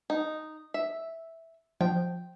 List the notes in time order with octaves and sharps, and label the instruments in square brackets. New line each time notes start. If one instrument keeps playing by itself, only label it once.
[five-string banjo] D#4
E5
[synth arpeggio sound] F3 [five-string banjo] G5